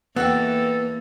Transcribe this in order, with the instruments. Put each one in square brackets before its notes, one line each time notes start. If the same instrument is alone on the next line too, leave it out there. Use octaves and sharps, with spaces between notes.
[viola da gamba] E2 A#3 [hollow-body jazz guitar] B3 [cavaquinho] F#4 E5 G5 [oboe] A4